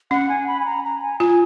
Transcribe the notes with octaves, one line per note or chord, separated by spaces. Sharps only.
C#4 F#5
G#5
B5
G#5
A#5
A#5
G#5
F4 G#5